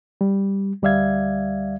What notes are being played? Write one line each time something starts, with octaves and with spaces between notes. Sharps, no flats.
G3
D2 G3 D5 E5 F5 G#6